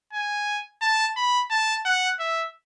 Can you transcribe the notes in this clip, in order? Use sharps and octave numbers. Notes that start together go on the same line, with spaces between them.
G#5
A5
B5
A5
F#5
E5